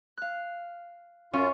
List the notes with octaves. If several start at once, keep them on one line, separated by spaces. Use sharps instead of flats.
F5 F#6
F#2 C#4 F4